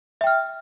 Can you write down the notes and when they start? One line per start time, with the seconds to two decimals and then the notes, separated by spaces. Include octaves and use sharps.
0.21 E5
0.24 G5
0.27 F6